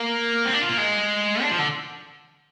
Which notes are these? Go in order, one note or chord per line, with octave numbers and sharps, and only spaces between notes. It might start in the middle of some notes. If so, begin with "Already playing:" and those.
Already playing: A#3
C4
D4
F4
A#3
G#3
D4
F3
D3